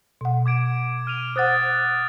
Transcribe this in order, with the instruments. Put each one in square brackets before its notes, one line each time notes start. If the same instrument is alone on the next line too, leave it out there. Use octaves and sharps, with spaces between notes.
[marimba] B2 F#5
[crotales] D6 G#6 D7
F6 D#7 F7
[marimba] C5 F#5 [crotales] D#6 F#6 A6